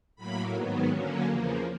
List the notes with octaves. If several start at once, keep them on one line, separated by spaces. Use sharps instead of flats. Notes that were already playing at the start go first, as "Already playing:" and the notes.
A2 F#3 A#3 B5
G#2 D#3 F#3 B3
D3 F#3 A#3 C#4
E2 C#3 F3 A#3